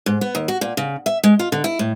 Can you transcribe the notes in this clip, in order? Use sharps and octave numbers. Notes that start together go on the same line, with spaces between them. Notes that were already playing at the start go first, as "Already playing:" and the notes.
G#2
B3
D#2
F#4
A#2
C#3
E5
G#3
F4
D3
E4
A2